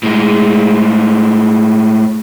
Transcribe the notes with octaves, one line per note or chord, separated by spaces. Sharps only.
A2 G#3